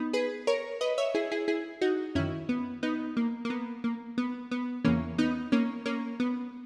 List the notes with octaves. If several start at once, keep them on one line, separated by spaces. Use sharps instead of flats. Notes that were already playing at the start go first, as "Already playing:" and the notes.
Already playing: B3 D#4
G#4 B4
A#4 C#5
B4 D#5
C#5 E5
E4 G#4
E4 G#4
E4 G#4
D#4 F#4
F#2 D#3 C#4 E4
B3
B3 D#4
A#3
A#3
B3
A#3
B3
B3
E2 C#3 E3 A#3 C#4
B3 D#4
A#3 C#4
A#3 C#4
B3